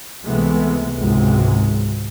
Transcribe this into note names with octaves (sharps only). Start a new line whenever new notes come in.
C#2 C3 E3 G#3 A3 B3
G#1 C#2 G#2 C3 F#3 G#3